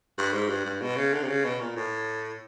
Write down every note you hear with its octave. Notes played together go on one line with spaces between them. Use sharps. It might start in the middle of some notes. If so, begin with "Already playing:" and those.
G2
G#2
G2
G2
B2
C#3
D3
C3
C#3
B2
A#2
A2